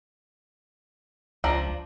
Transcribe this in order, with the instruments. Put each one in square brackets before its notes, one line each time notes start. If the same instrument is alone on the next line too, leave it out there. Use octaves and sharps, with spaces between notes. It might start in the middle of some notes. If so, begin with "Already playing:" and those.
[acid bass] C#2 [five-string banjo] F3 D4 A#5